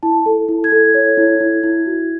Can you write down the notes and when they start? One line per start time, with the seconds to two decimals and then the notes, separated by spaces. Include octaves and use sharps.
0.03 E4 A5
0.26 A4
0.49 E4
0.64 G#6
0.72 A4
0.95 C#5
1.17 E4
1.40 E4
1.63 E4
1.86 F#4